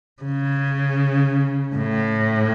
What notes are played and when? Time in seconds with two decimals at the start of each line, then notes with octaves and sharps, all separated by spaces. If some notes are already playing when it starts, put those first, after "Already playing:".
0.22 C#3
1.76 A2